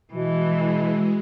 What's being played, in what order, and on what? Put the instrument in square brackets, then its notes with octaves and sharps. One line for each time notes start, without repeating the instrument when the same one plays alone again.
[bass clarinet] B2 [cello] E3 [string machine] G#3